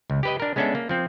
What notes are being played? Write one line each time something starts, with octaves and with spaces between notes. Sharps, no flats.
C#2
G4 B4 D#5
D4 A#4
G#3 B3 C#4 D4 A4 E5
A#3
F3 C4